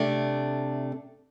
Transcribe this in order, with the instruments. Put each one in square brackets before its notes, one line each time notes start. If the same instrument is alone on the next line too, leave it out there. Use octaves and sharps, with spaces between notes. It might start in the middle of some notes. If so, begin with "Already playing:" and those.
Already playing: [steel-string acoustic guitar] C3 A3 D4